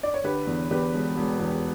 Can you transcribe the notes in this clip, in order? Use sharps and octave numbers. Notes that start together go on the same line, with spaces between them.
D5
C#5
D3 G4 B4
E2
E2 G4 B4
E1
E1
E2